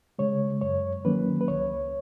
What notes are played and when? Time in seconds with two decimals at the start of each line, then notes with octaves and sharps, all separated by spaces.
0.19 C#3 G#3 C#5
0.61 F#2 C#5
1.05 D#3 F#3 A#3 C#4 B4
1.41 B4
1.48 C#2 C#5